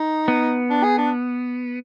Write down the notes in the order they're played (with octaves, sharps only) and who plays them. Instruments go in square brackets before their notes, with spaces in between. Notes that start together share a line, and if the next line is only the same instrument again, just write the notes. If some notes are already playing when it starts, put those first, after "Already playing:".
Already playing: [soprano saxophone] D#4
[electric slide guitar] B3
[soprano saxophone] D4
G#4
D4